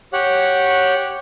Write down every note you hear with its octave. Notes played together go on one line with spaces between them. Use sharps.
G4 C#5 F#5